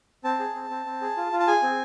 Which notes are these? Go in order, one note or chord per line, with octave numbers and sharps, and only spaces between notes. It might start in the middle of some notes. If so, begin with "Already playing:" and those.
C4 A5
G#4
C4
C4
C4
G#4
F4
F4
A5
G#4 G#5
C4